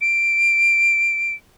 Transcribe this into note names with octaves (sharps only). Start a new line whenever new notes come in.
D7